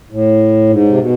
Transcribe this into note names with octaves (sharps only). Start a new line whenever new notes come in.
A2
G#2
C3
B2